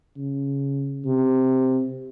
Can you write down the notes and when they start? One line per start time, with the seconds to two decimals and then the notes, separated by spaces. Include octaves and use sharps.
0.17 C#3
1.05 C3